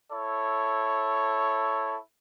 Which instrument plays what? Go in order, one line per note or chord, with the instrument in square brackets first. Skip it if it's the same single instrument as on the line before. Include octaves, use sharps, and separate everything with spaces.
[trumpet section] E4 A4 C#5